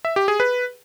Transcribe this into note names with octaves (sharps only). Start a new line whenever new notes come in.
E5
G4
G#4
B4